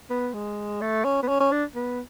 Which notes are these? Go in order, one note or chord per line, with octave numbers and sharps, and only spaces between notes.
B3
G#3
A3
C#4
B3
C#4
C#4
D4
B3